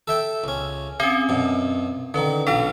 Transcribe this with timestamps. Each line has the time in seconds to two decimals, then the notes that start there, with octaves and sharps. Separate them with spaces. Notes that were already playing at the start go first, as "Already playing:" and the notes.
0.08 A4 E5 G5
0.44 C#2 C#4
1.00 C4 C#4 G#4
1.29 F#2 B2
2.14 D3 D#3 C#4 B4
2.47 B1 D4 F4 A4 F5